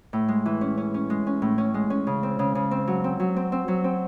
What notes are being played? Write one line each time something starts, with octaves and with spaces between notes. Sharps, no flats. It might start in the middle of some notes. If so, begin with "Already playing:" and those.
A2
G#3
E3
C#4
C#4
C#4
G#3
C#4
A2
C#4
G#3
C#4
C#3
C4
C#3
C#3
C4
F#3
C4
F#3
C4
C4
F#3
C4